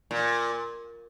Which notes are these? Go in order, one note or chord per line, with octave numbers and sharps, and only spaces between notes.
A#2